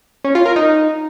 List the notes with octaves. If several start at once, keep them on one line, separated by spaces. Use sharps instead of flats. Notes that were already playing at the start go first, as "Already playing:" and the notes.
C#4
F4
A#4
D#4